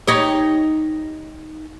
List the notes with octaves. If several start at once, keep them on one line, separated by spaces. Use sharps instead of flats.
D#4 G4 C#5